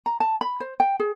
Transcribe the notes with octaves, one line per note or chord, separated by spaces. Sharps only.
A#5
A5
B5
C5
G5
G#4